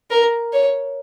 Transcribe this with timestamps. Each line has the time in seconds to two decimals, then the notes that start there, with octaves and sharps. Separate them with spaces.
0.11 A#4
0.52 C#5